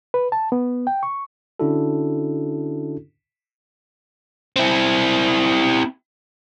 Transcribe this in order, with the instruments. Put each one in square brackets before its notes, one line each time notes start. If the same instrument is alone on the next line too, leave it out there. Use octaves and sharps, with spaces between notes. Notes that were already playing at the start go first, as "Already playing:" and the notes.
[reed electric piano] B4
A5
B3
G5
C#6
[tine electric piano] D3 C#4 D4 E4 F#4 A4
[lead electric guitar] C4 E4